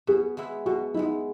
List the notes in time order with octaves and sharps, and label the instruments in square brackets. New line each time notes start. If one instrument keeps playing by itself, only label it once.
[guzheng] B2 [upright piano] G#4
[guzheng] G#3 B3 E4
[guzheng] B2 [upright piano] F#4
[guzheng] G#3 B3 E4 [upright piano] D#4